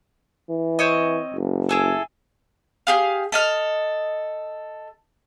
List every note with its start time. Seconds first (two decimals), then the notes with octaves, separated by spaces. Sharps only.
0.50 E3
0.79 C4 C#5 D#5
1.34 F#1
1.69 E4 G#4 A4
2.87 G4 G#4 F5
3.32 A4 D#5 F6